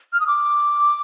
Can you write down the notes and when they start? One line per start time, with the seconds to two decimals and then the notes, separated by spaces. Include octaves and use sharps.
0.13 F6
0.20 D#6
0.27 D6